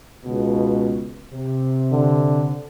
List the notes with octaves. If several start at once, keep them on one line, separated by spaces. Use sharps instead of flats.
C#2 B2
C3
D3